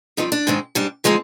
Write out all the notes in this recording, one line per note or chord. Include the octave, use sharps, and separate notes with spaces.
G2 F3 C4 D#4
D4
G#2 D#3 G#3 C4
G#2 G3 D4
D3 F3 G#3 C4 D#4